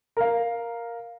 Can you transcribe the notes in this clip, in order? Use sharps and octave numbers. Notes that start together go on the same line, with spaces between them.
A#4 F5